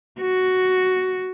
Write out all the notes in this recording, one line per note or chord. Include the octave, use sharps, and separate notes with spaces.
F#4